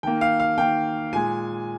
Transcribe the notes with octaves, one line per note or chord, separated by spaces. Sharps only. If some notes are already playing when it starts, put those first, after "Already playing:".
D#3 A#3 G5
F5
F5
D#3 A#3 G5
A#2 G#3 G#5